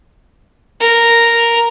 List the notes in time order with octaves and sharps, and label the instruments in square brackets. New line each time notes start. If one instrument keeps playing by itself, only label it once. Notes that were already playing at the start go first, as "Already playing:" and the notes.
[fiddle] A#4